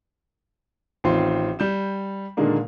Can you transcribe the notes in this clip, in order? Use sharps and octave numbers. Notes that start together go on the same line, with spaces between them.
A1 D#3 C4 F4 C6
G3 G6 E7
A#2 D3 D#3 G#3 A#3 D4